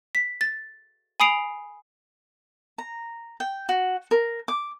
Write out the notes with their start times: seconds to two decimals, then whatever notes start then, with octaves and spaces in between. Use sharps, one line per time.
0.15 B6
0.41 A6
1.20 G#5 B5 D#6 C7 D7 F7
2.78 A#5
3.40 G5
3.69 F#4
4.11 A#4
4.48 D6